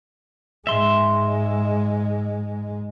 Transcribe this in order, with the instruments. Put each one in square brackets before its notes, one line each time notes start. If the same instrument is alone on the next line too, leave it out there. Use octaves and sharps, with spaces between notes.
[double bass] G#2 G#3 [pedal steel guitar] E5 C6